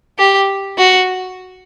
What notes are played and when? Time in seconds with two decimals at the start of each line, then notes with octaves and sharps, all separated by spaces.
0.19 G4
0.78 F#4